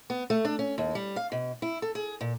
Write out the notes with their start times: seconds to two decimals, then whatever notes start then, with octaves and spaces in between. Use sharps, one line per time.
0.10 B3
0.30 A3
0.45 D4
0.59 C#4
0.78 D#2
0.95 G3
1.16 F5
1.32 B2
1.62 E4
1.82 A4
1.95 G#4
2.21 A#2